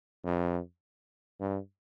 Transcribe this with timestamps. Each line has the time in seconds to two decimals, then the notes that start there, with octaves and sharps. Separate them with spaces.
0.25 F2
1.40 G2